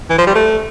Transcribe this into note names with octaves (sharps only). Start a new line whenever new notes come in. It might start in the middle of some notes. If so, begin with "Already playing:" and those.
E3
F3
G3
A3